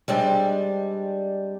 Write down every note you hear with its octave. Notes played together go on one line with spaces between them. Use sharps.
G3 G#3 C4 D4